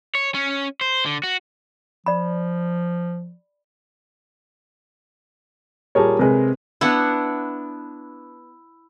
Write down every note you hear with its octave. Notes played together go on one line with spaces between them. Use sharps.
C#5
C#4
C5
D3
F#4
F3 D5 B5
A#2 G3 G#4 A#4 C#5 A5
C3 G#3 C4 A#4 B4
B3 D4 E4 F#5